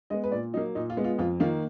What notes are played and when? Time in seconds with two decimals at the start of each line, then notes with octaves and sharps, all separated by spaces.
0.10 G#3 B3 D#5
0.24 B4
0.32 A#2 D5
0.54 F#3 D#4
0.57 A#3
0.75 A#2 D#4
0.90 F4
0.97 G#3 B3
1.04 F4
1.19 F2 F4
1.40 D#3 A#3 F4